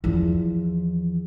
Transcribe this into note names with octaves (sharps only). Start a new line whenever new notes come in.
E2 F3